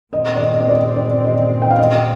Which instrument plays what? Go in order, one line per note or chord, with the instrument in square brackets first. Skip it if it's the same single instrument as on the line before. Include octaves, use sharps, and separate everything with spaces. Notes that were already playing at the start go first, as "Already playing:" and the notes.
[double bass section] A#2 G#3 C4 [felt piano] D#5
[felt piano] D5
D#5
D#5
D5
D5
D#5
G5
F5
D#5